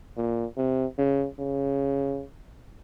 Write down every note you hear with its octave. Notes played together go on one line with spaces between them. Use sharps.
A#2
C3
C#3
C#3